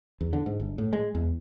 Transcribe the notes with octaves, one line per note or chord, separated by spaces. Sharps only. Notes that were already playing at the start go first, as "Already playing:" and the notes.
E2
D3
G#2
G1
A2
G#3
E2